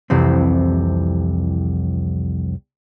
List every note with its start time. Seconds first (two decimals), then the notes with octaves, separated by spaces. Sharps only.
0.10 C2 F2 C3 E3 C4